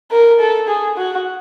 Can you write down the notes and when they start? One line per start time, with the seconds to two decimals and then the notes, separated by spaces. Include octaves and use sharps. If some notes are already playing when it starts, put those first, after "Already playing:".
0.11 A#4
0.40 A4
0.68 G#4
0.97 F#4